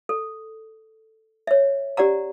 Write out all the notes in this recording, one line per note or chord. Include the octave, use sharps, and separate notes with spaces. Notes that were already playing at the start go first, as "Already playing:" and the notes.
A4
C#5 E5
C#4 G4 D5 F#5 A#5